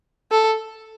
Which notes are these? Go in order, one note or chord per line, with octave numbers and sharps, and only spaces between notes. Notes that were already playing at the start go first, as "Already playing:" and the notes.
A4